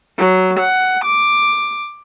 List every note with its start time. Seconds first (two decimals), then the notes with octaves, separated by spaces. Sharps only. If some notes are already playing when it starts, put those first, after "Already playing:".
0.17 F#3
0.60 F#5
1.05 D6